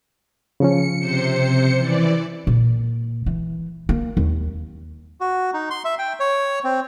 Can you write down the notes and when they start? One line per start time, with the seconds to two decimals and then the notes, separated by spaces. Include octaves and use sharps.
0.60 C#3 F3 C#4 C#7
0.99 C3 C5 C#7
1.77 E3 D5
2.47 A#2
3.26 E3
3.89 A#3
4.17 D#2
5.21 F#4
5.54 D#4
5.70 C6
5.85 E5
5.99 G5
6.20 C#5
6.64 C4